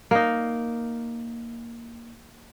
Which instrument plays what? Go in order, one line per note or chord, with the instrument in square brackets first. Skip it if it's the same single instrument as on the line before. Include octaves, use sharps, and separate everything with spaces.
[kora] A#3 D#4